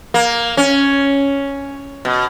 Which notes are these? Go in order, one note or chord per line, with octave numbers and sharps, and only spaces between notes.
A#3
C#4
B2